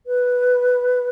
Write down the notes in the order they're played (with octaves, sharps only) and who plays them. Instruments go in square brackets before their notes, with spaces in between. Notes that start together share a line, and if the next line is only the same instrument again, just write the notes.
[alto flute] B4